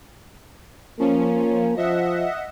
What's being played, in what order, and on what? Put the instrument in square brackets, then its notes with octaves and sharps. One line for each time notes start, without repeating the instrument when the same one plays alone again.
[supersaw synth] F3 C#4 [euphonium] A#3
[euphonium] F3 [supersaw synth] D#5 E5 F#5